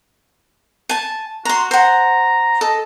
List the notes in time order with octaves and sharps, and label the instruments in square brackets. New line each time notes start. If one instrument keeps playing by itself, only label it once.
[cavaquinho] G#5 A5
[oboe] F#4 [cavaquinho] A#5 C6
[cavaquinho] C5 F#5 [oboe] A#5
[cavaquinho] A4 [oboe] D#5